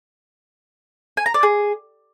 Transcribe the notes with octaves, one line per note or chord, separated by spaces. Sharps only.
G#5
A#5
D5
G#4